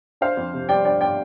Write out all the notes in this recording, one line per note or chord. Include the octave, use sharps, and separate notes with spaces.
D4 C5 F5
F2
C3
G3 D5 G5
D4 D5 G5
D5 G5